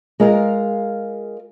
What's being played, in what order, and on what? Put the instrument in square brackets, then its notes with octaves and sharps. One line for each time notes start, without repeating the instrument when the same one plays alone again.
[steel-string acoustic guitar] G#3 F4 A#4 F5